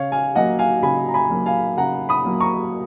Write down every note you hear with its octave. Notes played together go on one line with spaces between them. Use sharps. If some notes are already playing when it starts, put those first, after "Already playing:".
Already playing: C#3 C#5 F5
F5 G#5
F#3 A#3 D#5 F#5
F5 G#5
C#3 G#5 B5
A#5
G#5 B5
F#3 A#3
F5 G#5
C#3 F#5 A#5
B5 D#6
F#3 A#3
A#5 C#6